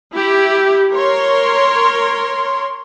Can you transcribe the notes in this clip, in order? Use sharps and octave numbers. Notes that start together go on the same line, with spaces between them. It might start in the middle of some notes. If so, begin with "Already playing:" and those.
E4 G4
A#4 C#5 C6